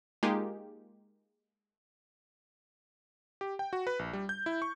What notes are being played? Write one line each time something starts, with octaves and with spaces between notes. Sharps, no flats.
G#3 A#3 D#4 F4 G4 G#4
G4
G5
F#4
B4
A#1
G3
G6
E4
C#6